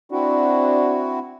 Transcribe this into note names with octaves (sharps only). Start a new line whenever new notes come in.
C4 D4 E4 F#4